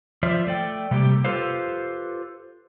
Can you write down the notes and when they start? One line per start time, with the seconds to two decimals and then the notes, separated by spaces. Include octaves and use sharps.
0.23 F3 F4 C5 D5 E5
0.47 A3 D5 G5
0.91 C3 G3 A3 A#3 G4
1.24 F4 G4 A4 B4 C5 F5